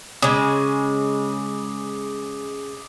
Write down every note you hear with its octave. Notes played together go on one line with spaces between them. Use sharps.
C#3 G#3 D6 D#6